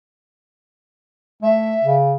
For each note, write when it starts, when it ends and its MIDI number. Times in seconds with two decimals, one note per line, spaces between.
1.42 1.77 57
1.42 1.95 76
1.84 2.16 49